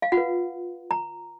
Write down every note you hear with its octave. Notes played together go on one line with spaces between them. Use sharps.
F5
F4 F#5
B4
A#5